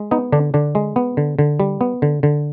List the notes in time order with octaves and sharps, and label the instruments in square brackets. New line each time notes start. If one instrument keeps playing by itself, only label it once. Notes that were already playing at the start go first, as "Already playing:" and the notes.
Already playing: [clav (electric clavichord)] G#3
B3 D#4
D3 D4
D3 D4
G#3
B3
D3
D3
G3
B3
D3
D3